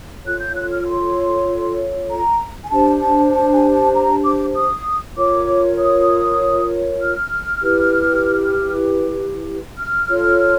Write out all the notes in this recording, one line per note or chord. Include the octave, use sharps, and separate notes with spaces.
F4 A4 C#5 F#6
G6
F#6
F6
C6
A#5
G#5
D4 G4 C5 A5
A5
A5
G#5
A5
A#5
D6
D#6
F4 A#4 C#5 D6
D#6
F6
E4 G4 B4
F6
F4 A4 C#5